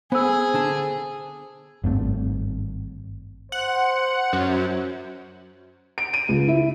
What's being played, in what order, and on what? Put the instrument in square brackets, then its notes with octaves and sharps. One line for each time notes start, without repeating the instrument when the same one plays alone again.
[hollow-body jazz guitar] B3 [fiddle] G#4 [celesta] C5 E6
[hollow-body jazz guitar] D3 D4 A5
[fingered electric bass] G#1 G2 A3 C4
[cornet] C5 [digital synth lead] F#5
[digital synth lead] F#2
[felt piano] D7
D#7
C#2
E4